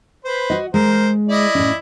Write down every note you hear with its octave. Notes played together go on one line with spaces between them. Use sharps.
B4 C5
F#4 D#5
G#3 A#4 C5
E4 D5 D#5
A2 C#4